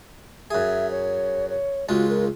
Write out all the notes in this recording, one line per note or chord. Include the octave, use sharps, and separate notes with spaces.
F#2 G#4 E5
C#5
C#5
C#2 G#3 F4 F#4
A#4